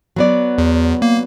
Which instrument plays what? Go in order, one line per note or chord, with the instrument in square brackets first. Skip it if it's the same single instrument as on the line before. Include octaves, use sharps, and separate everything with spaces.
[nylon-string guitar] F#3 B3 D5
[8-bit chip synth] E2
A#3